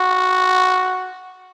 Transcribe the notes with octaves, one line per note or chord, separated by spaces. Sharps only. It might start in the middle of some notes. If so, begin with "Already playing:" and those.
Already playing: F#4